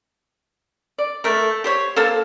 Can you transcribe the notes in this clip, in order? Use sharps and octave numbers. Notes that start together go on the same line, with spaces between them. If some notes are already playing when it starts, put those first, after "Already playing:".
D5
A3 A#4
G4 C5 C#5
A#3 A4 C5 A5